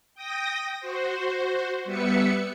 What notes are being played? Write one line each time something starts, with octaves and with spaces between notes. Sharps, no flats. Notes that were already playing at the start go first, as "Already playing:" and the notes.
G5 D#6 A#6
F#4 C5
G3 B3 B4 E5 C#7